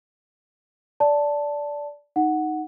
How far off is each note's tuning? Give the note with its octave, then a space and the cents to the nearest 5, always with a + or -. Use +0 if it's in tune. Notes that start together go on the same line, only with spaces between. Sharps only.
D5 -15 A5 +0
D#4 +0 F#5 +0